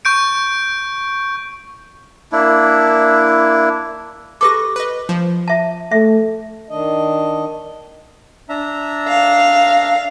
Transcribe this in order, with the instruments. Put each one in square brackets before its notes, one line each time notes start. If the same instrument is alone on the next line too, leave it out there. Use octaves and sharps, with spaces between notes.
[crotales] C#6 G6 D7
[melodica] A#3 D4 E4
[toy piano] G4 D6 [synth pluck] A4 B4 A#6
[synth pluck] B4 D#5
F3
[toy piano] E5 A5
[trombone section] A3 [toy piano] E5
[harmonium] D#3 D4 D#5
[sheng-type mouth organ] D4 E5 A#5
[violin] F5